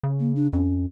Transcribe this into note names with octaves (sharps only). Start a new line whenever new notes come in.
C#3
A#3
D4
F2 C#4